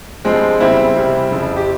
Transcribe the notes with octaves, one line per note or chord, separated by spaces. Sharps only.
G2 F3 G#3 C4
E2 C#3 G3 C4 E4
C2 C3 G3
F2 C#3 F3
G4